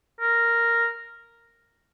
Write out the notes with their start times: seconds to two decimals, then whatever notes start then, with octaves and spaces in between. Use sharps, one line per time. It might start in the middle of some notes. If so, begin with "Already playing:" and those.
0.21 A#4